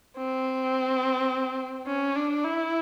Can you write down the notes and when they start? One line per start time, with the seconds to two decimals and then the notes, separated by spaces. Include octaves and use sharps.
0.17 C4
1.87 C#4
2.16 D4
2.44 E4